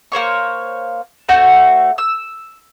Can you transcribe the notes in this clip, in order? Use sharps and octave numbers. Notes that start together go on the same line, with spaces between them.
A#3 C5 C#5 C#6
A3 C4 F#4
E6